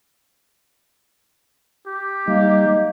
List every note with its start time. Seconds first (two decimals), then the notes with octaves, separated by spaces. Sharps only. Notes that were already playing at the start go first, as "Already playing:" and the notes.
1.87 G4
2.28 G3 A#3 D#4